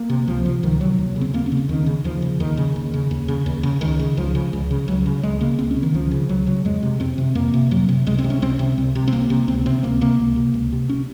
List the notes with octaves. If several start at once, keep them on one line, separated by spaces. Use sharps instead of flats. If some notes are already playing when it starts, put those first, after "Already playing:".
Already playing: A#3
C3
C#2 F3
C3 F3
C#2 D#3
C3 F#3
D#2
C#3
C4
D#2 A#3
C#4
C#3
C4
D#2 D#3
C#3
D#2 F3
C#3
D#2 D#3
C#3
D#2
C#3
D#2
C#3
D#2
C#3
C#2 D#3
C#3
C#2 F3
C#3
C#2
C#3
C#2 F#3
C#3
C#2 G#3
C#3 A#3
C#2 C4
C#4
C#3
D#3
C#2 F3
C#3
C#2 F#3
C#3 F#3
F2 G#3
C3
F2 C4
C3
F2 A#3
C3
F2 F#3
C3
C2 G#3
C4
C3
C#4
C2 C4
C3
C2
C3
C4
C2 A#3
C3
C#2 C4
C3 C4
C#2 A#3
C3 A#3
C#2
C3
C#2
C3
C#4